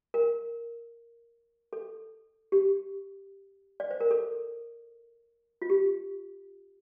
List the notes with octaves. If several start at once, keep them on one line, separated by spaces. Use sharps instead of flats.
A#4
A4
G4
D5
C5
A#4
A4
F4
G4